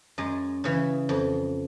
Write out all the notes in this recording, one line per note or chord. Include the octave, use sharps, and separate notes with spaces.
F#2 G#3
C#3 E3
F2